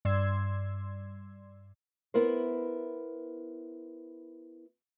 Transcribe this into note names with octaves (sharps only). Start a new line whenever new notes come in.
G2 D5 C6 E6 G#6
B3 E4 A#4 C5